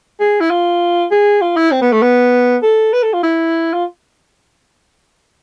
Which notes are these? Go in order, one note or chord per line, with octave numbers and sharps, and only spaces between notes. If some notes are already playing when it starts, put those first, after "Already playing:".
G#4
E4
F4
G#4
F4
E4
C4
B3
A3
B3
A4
B4
A4
F4
E4
F4